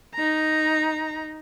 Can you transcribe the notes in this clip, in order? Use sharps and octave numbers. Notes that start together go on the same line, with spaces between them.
D#4 A#5